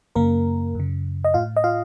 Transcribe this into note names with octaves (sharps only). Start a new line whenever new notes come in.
F#2 C#3 A#3 A#4
F#2 C#3
D#5
A2 F4 F5
D#5
F4 F5